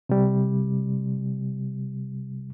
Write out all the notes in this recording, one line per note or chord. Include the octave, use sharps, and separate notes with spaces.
C3 G3